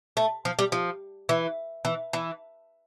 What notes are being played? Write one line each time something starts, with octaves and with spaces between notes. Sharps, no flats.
A3
F3
G3
F3
E3
E3
E3